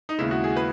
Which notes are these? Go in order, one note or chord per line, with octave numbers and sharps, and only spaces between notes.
D#4
D#2 C#3 G#3 B3 E4
F#4
G#4
B4